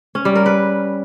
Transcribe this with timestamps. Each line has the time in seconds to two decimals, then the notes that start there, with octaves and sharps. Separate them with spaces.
0.15 C#4
0.25 G3
0.35 A#4
0.46 B4